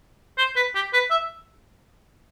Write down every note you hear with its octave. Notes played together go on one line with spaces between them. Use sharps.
C5
B4
G4
B4
E5